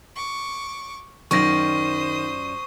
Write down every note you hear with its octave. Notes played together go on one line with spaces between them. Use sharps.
C#6 D6
F#2 D#3 F4 C5 D5 C#6 D#6 A#6